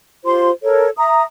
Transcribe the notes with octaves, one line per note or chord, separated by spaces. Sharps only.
F4 G4 C5 C6
A4 A#4 C#5
E5 A#5 D#6